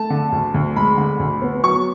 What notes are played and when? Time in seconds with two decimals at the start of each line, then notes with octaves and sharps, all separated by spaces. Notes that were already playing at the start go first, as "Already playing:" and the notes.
Already playing: A3 A5
0.10 D3
0.32 D2
0.54 D2
0.76 G#3 B5
0.98 D3
1.19 D2
1.42 B3
1.64 F#3 C#6